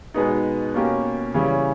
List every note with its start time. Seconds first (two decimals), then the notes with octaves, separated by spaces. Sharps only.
0.14 B2 G#3 B3 D#4
0.74 B2 A#3 C#4 G4
1.34 C#3 E3 G3 C#4